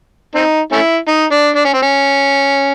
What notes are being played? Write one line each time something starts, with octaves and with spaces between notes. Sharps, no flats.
C4 D#4
A3 C#4 E4
D#4
D4
D4
C#4
C4
C#4